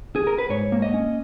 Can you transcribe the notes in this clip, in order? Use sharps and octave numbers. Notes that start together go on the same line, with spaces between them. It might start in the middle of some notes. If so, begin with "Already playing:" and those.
G#4
A#4
B4
G#2 C#5
A#3
D#5
C#4